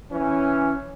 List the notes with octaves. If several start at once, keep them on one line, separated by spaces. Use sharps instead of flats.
E3 C#4